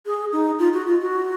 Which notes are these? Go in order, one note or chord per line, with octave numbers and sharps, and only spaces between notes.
G#4
D#4
F4
F#4
F4
F#4